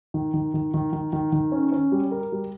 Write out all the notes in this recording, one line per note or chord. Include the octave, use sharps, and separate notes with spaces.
D#3
D#3
D#3
D#3
D#3
D#3
D#3
C#4
C#4
G3
A#4
G3